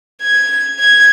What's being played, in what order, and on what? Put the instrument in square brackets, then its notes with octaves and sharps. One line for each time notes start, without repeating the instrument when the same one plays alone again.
[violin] G#6
G#6